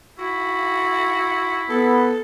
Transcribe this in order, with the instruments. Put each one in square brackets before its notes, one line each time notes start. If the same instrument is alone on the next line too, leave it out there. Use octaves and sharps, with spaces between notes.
[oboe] E4 [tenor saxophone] F#4
[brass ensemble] B3 [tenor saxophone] A4